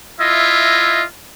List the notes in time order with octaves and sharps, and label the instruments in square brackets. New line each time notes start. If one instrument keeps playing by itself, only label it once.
[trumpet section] E4 F4 D#5 E5